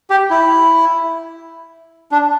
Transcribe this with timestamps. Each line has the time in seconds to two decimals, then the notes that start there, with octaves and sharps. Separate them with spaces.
0.10 G4
0.31 E4
2.12 D4